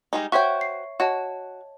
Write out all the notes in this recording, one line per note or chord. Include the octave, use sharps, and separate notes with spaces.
G3 G#3 D#4
F#4 C5 C#5 E5 G5 C#6
C7
F#4 C#5 D#5 A5